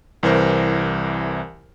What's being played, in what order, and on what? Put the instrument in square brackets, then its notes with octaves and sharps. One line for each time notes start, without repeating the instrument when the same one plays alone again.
[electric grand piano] C2 E3 A#4 C5